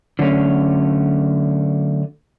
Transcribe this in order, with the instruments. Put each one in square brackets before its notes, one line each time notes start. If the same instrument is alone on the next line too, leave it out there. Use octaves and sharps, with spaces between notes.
[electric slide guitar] D3 F#3 A3 C#4